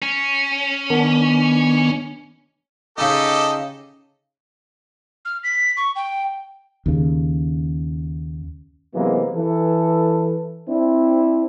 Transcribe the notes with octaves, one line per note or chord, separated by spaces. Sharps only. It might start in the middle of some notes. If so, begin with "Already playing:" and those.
C#4
D#3 B3 D4
C#3 D#4 G4 A4 D#5
F6
B6
C#6
G5
D#2 C#3
C3 E3 F#3 G#3 A#3 B3
E3 A4
C4 D4 E4